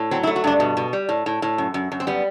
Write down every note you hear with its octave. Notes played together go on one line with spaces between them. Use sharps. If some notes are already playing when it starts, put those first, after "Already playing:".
Already playing: A2
F#3 C4
E4
A3
F#4
G2 D4
B2
B2
G3
A2
A2
A2
F#2
F#2
F#2
C4
G3 B3